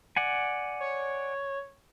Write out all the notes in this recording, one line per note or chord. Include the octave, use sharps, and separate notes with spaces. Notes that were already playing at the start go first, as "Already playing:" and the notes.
D5 F#5 G#5
C#5